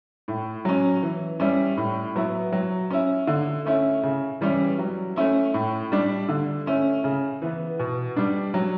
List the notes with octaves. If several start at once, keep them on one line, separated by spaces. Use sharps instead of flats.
A2
F#3 C#4
E3
G3 C#4 E4
A2
F#3 B3 E4
F#3
C#4 E4
D3
A3 C#4 E4
C#3
E3 G3 C#4 E4
F#3
A3 C#4 E4
A2
G3 D4
D3
A3 C#4 E4
C#3
E3 B3
B2
G3 D4
F#3